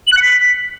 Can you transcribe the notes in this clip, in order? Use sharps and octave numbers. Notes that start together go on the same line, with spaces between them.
F#7
F#6
C#7
B6